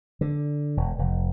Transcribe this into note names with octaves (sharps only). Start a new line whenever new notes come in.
D3
E1
F1